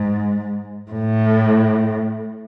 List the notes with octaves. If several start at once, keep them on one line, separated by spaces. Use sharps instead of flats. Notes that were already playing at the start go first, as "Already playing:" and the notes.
Already playing: G#2
A2